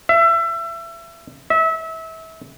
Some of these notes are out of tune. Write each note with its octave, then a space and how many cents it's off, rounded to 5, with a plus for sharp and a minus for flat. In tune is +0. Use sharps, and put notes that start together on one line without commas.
E5 +30
E5 -25